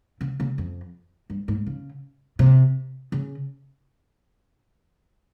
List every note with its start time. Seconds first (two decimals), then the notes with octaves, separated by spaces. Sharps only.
0.21 C#3
0.40 C#3
0.58 F2
1.30 G2
1.48 G#2
1.66 C#3
2.39 C3
3.12 C#3